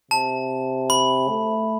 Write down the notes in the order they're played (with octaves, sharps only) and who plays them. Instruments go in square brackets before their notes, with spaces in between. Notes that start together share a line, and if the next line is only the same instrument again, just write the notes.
[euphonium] C3 [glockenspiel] A5
[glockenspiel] B5
[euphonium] A3